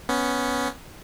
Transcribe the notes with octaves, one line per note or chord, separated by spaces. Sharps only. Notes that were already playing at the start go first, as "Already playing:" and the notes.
B3 C#4